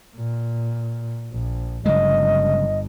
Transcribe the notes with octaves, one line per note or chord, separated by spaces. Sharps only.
A#2
A#1
G1 C#3 F#3 G#3 D#5